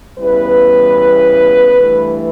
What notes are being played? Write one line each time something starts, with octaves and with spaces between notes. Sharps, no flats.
E2 C#3 E3 G3 B3 B4
G2 E3 A3